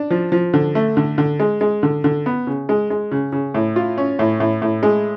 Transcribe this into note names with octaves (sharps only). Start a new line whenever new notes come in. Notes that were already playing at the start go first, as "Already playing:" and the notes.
Already playing: D4
F3
F3
D3
A3
D3
D3
G#3
G#3
D3
D3
B3
C#3
G#3
G#3
C#3
C#3
A2
F4
C#4
A2
A2
A2
G#3